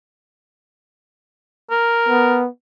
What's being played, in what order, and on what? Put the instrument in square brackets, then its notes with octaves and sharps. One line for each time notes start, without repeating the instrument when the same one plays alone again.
[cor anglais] A#4
[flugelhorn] B3